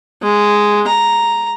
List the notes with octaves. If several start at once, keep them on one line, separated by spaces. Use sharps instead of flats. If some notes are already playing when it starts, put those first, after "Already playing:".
G#3
A#5